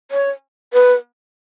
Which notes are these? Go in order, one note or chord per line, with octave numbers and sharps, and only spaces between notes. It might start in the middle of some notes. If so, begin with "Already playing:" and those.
C#5
B4